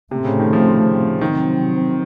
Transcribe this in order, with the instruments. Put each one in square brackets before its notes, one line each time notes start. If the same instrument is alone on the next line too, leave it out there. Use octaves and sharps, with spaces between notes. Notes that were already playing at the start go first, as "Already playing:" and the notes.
[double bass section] A2 A3 C4 [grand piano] C3
[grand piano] C#3
D#3
F3
[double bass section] C3 F#3 C4 [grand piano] D#3